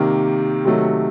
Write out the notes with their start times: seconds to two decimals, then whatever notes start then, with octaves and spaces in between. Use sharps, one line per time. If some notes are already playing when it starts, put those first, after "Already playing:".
Already playing: C3 D#3 A#3
0.65 C3 D#3 F#3 A3